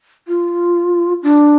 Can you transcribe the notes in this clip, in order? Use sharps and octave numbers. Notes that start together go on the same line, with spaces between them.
F4
D4